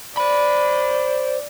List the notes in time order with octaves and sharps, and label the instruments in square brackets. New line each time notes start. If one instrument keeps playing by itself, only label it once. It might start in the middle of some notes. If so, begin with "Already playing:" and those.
[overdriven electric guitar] C5 B5 [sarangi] D5